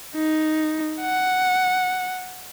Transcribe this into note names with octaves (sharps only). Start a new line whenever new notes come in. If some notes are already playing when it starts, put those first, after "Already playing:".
D#4
F#5